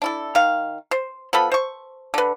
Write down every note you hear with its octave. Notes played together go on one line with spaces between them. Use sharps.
D4 E4 A4
D#3 F5
C5
F3 B3 A4 B5
C5 C#6
D3 B4